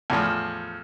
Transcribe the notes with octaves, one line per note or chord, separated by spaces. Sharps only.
E2 A2 F3